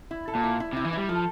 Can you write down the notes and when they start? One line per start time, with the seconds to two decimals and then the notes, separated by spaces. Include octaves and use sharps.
0.11 E4
0.28 A4
0.35 A#2
0.44 E4
0.60 E4
0.73 C3 E4
0.85 E3
0.93 G3 E4
1.09 F3 A4